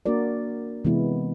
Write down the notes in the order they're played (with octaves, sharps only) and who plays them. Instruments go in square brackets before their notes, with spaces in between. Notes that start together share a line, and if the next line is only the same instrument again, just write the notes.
[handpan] A#3 D4 F#4 A#4 D5
C3 E3 G#3 B3 E4